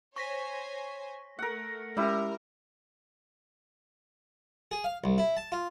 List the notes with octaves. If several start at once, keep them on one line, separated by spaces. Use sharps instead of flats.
C5 C#5 G#5 C#6 A#6 B6
A3 A#4 F#5
G3 G#3 C#4 E4 A#4
G#4
F5
C2
E4
A5
F4